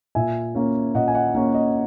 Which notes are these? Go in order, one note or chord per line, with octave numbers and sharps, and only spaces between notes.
A#2 E5 G#5
A#3 C#4
A#2 D#5 F#5
G#5
D#5 F#5
A#3 C#4
D#5